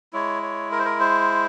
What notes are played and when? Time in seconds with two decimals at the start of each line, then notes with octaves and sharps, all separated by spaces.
0.13 G#3 E4 C#5
0.42 C#5
0.72 A#4
0.79 C5
0.85 A#4
1.00 C5